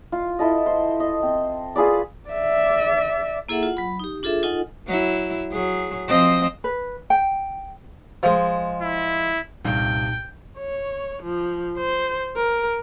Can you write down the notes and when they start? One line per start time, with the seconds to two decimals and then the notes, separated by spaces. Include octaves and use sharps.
0.12 F4
0.39 E4 A4 D#5
0.66 C5
1.00 D#5
1.23 C4
1.76 F4 G#4 B4 D5
2.29 D5 E5
3.49 A#3 E4 G#4 A4 E5 F#5
3.63 F4 F#5
3.77 F#3 B5
4.00 D#4 G4
4.23 D4 F4 G#4 A4 E5
4.43 D#4 F4 A4 D#5 F#5 G#5
4.88 F#3 E4
5.51 F#3 G#4
6.08 F3 C4 D#5
6.64 B4
7.10 G5
8.23 F3 G#3
8.82 E4
9.65 C2 G2 A#2 D#4 F5 G5
10.58 C#5
11.23 F3
11.77 C5
12.36 A#4